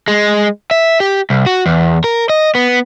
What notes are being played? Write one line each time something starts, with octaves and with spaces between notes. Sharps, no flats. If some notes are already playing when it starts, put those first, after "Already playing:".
G#3
E5
G4
C2
F#4
E2
A#4
D#5
B3